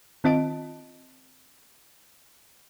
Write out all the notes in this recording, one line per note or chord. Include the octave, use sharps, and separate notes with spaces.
D#3 C4 F4 D#5 A5 D7